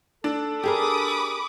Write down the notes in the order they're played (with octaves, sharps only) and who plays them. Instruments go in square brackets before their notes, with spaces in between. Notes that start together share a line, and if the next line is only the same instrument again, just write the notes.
[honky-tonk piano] D4 [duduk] A4
[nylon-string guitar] G4 G#4 A#4 [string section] B5 D6 D#6